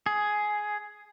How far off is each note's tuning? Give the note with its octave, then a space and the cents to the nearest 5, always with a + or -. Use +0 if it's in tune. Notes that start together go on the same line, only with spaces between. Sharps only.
G#4 +10